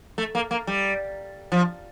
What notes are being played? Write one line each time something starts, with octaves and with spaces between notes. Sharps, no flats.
A3
A#3
A#3
G3
F3